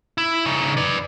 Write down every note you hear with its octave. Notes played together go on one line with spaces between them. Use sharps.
E4
C#3 D#4
B4 D5